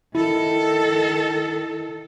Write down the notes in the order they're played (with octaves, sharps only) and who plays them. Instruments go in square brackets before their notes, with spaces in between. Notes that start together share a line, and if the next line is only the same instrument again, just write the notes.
[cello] D#3 A4 [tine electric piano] E4